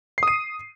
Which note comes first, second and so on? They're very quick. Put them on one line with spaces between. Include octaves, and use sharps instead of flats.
C7 D#6 D#7